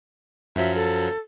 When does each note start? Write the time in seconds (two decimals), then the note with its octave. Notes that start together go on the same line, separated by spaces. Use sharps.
0.56 F#2 F3 F#3 E5
0.75 A4